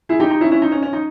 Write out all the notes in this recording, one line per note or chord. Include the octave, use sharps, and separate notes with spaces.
E4 G#4
D#4 G4
D#4
C#4 E4
C#4 E4
D#4
C#4
C#4
D#4